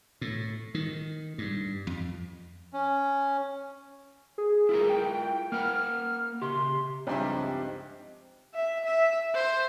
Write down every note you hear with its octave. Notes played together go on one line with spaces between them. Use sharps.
A2
D#3
G2
F2
C#4
G#4
E4 F4 A#4
G5
G5
A#3 A#4 F#5 F6
C#3 G4 C6
C#2 G2 F3 C4 D#4 G4 E5
E5
E5
C5